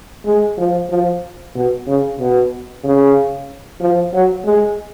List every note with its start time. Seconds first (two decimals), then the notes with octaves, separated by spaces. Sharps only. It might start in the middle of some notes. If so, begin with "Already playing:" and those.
0.25 G#3
0.58 F3
0.90 F3
1.55 B2
1.87 C#3
2.20 B2
2.84 C#3
3.81 F3
4.14 F#3
4.45 G#3